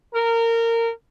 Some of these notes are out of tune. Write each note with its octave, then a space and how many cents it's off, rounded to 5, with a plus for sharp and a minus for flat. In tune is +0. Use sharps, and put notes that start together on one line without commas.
A#4 -20